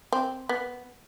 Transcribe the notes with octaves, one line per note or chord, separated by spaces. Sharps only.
C4
B3